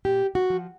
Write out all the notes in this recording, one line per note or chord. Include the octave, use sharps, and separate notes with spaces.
A#2 G4
F#4
F3